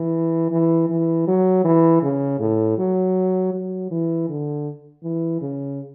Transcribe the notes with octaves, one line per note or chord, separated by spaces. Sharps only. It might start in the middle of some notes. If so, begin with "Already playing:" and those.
Already playing: E3
E3
E3
F#3
E3
C#3
A2
F#3
F#3
E3
D3
E3
C#3